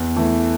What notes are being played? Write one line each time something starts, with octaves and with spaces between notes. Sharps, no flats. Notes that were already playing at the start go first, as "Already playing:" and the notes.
Already playing: E2
E3 A3